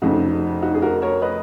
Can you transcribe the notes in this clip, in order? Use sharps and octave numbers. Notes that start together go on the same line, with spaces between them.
F1 F2 C#3 D#4 F#4
D#4 F#4
G#4
F#4 A#4
A#4 C#5
B4 D#5